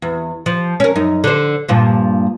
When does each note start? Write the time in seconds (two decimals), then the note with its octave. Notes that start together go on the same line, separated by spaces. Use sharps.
0.02 E2
0.46 F3
0.80 C#4 A#4
0.96 F#2 D#4
1.24 D3 C5
1.68 G2 A#2 F3